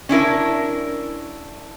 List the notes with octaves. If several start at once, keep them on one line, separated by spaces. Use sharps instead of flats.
C#4 D4 E4 A#4